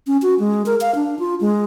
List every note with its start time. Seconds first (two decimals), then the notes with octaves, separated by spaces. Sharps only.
0.07 C#4
0.22 F#4
0.39 G#3
0.66 A#4
0.81 F5
0.95 D4
1.19 F4
1.41 G#3